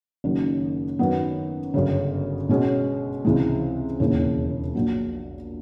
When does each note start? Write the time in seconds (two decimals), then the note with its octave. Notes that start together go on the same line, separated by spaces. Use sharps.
0.24 F#1 F#2 D#3 F#3
0.99 F#2 D#3 F#3 B3
1.74 G1 F#2 C#3
2.49 B2 G#3 C#4
3.25 C#2 C3 E3 G#3
4.00 E1 D#2 C#3 E3
4.75 A#1 A#2 F#3